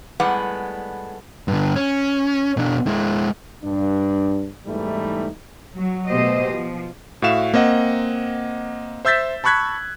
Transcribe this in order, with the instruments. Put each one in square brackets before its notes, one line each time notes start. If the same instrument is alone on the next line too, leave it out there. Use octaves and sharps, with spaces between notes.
[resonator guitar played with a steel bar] A2 G3 G#3 B3 F#5
[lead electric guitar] G2 D3
C#4
B2 D4
G#3 E4
[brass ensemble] G2 D4
E2 G#2 E3 G3 A3 D#4
[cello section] F#3
B2 A3 G4 C5 D#5
F3
[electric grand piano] A2 F#4 E5 F5 E7
A#3 C4 D#5 F#5
C5 E5 E6 G6 A6 B6
A5 B5 C#6 F#6 G#6 B6